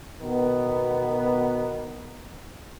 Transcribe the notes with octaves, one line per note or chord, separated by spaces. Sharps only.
B2 D#3 B3